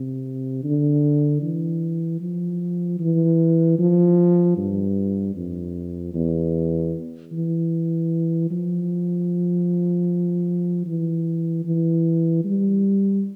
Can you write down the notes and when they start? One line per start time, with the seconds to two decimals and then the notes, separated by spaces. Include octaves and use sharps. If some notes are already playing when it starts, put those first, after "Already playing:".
Already playing: C3
0.64 D3
1.42 E3
2.21 F3
3.00 E3
3.79 F3
4.57 G2
5.36 F2
6.14 E2
7.33 E3
8.51 F3
10.87 E3
11.65 E3
12.44 G3